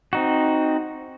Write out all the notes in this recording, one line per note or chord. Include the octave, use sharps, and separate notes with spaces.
C4 D#4 F#4